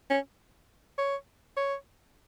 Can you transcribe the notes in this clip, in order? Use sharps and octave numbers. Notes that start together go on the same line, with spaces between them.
C#4
C#5
C#5